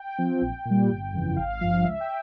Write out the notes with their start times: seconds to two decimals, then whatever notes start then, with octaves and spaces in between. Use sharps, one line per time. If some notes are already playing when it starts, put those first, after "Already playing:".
Already playing: G5
0.18 F3 C4
0.41 A#1
0.65 A#2
0.70 G3
0.89 G1
1.14 F2 C#3 E3
1.36 G#1 F5
1.61 G2 F3 F5
1.84 C#2 E5
2.00 G5